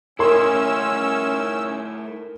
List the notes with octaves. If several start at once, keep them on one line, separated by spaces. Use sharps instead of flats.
A3 C#4 D#4 E4 A#4 C6 E6